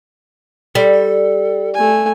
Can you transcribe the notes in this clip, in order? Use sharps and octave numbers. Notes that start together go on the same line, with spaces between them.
G3 A4
A3 G#5